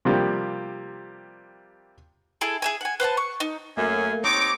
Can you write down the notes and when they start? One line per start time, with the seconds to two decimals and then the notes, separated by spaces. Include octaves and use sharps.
0.05 C3 F3 G3 A#3
2.41 E4 G#4 A4
2.62 G#4 E5 G#5
2.81 F#5 G#5
3.00 B4 C5 F#5 A5
3.17 C#6
3.40 D#4
3.77 F#2 A3 A#3 G#5
4.24 C3 C4 D#4 C#5 D6